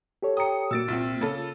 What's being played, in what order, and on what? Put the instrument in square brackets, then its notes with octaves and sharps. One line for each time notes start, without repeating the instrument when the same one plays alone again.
[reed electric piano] G4 A4 C#5
[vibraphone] G5 A#5 [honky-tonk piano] D#6 C#7
[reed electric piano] A#2 A#3 [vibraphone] F#4 [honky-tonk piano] E6 A6 D7
[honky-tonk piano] C2 C4 [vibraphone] F4
[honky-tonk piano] C#3 A4 [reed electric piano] A#3